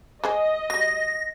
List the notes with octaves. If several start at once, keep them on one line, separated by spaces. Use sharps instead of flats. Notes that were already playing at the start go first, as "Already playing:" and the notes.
G#3 G#4 C5 D#5
F#3 G3 A#6